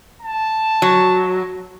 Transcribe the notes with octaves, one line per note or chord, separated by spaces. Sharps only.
A5
F#3